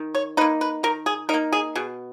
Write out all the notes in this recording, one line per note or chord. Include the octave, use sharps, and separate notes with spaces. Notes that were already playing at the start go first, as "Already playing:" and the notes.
Already playing: D#3
C#5
A#3 D#4 B4
B4
D#3 A#4
G#4
A#3 D#4 A#4
G#4
B2 G#4